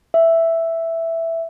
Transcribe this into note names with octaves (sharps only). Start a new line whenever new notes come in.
E5